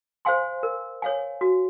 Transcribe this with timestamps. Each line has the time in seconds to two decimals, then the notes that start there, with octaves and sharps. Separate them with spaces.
0.25 C5 F5 G#5 C6
0.63 A#4
1.02 C#5 F5 G#5
1.41 F#4